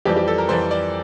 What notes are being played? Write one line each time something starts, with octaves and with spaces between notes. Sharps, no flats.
F2 E3 G3 G4
G4
A4
A#4
F2 E3 G3 C5
D5